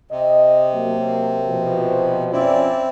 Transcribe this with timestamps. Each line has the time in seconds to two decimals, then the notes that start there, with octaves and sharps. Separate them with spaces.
0.11 C3 D#5
0.73 F#3 A#3
1.48 B2 F3
2.33 F2 C4 C#4 E4 D5